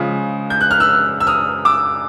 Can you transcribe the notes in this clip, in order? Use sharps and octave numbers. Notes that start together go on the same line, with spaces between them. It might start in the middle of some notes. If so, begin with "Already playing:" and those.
Already playing: C#3 F3 G#3 D#6
G6
F#6
F6
E6 F#6
E6
D#6 F6
D6 E6